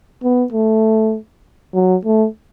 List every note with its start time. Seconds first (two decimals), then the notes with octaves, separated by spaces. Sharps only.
0.23 B3
0.53 A3
1.74 F#3
2.05 A3